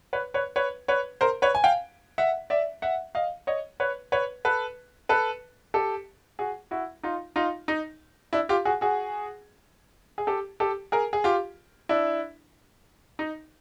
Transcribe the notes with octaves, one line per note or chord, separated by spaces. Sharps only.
B4 C#5
B4 C#5
B4 C#5
B4 C#5
A#4 C5
B4 C#5
G#5
F5 G5
E5 F#5
D5 E5
E5 F#5
D#5 F5
C#5 D#5
B4 C#5
B4 C#5
A4 B4
A4 B4
G4 A4
F#4 G#4
E4 F#4
D#4 F4
D#4 F4
D#4
D4 E4
F4 G4
F#4 G#4
F#4 G#4
G#4
G4 A4
G4 A4
G#4 A#4
G#4
F4 G4
D4 E4
D#4